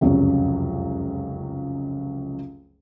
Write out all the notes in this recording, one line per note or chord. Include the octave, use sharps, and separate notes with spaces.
F1 C#2 F#2 C#4